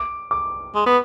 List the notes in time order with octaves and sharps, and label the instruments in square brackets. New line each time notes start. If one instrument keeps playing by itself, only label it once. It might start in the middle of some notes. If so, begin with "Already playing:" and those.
Already playing: [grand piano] D6
D6
[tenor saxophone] G#3
B3